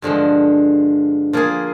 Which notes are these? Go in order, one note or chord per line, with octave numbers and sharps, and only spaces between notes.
G2 D3 F3 G#3
F3 A#3 F4 G#4